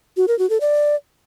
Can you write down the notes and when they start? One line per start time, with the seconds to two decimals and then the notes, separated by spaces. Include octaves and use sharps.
0.17 F#4
0.28 A#4
0.39 F#4
0.50 A4
0.61 D5